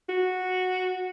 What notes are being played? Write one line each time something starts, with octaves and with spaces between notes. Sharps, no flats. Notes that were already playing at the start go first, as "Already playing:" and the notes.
F#4